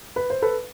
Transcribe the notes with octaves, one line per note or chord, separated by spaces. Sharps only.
B4
C5
A4 B4